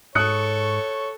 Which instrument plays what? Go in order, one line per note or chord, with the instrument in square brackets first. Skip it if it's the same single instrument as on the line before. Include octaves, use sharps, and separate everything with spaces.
[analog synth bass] G#2 [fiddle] A4 C#6 [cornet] C#5 [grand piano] D#6 F#6 C#7